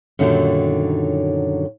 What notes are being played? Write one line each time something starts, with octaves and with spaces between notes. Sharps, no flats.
F#2 A#2 D3 D#3 F#3 G3